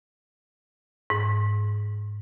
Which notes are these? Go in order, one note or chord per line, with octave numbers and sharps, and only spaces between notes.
G#2